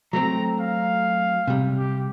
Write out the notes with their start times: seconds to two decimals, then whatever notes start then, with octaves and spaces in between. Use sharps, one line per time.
0.13 F#3 A3 C4 A#5
0.61 F5
1.47 C3 G3
1.78 G4